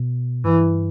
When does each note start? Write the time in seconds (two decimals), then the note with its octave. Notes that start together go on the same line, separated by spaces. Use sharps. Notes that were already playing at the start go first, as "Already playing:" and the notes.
Already playing: B2
0.44 G2 E3